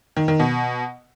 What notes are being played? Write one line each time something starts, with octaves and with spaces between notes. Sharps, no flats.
D#3
D#3
B2